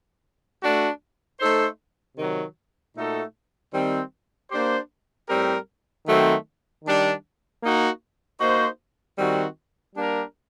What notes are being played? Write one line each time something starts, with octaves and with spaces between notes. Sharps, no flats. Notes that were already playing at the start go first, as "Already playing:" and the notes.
A3 D4 F#4
A3 D#4 A4 C5
C3 D#3 F#3
A#2 A3 D#4 F#4 A4
D#3 G3 C4
A#3 D4 G4 C5
A2 G3 C4 G4 A#4
D#3 F#3 A3 C4
D#3 G3 D4
A#3 D#4 F#4
A#3 D#4 F#4 C5
D#3 G3 C4 F#4
G3 A#3 D4 G4 A#4